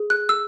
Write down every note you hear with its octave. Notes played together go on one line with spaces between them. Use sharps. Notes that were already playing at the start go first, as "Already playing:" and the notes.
Already playing: G#4
F#6
E6